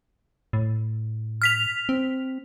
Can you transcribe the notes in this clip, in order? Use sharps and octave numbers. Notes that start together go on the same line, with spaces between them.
A2
F6 B6 F7
C4